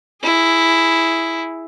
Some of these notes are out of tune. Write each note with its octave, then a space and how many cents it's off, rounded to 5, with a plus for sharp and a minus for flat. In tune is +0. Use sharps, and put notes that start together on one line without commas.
E4 +0 G#4 +0